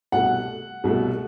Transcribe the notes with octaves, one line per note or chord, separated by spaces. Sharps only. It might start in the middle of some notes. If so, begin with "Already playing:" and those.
C2 B2 A3 F#5
C2 B2 A3